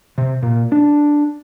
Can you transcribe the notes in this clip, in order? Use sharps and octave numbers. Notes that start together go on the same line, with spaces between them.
C3
A#2
D4